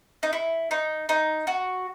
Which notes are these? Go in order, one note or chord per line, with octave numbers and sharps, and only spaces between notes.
D#4
E4
D#4
D#4
F#4